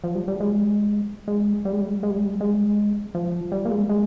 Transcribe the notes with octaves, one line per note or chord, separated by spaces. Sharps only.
F3
G3
G3
G#3
G#3
G3
G#3
G3
G#3
G3
G#3
G3
G#3
G3
G#3
F3
G3
A#3
G#3
G#3